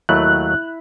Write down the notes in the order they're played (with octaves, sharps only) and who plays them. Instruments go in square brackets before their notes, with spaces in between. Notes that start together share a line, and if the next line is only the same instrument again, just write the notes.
[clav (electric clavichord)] D#2 F#3 A3 [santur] E4 [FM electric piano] F#6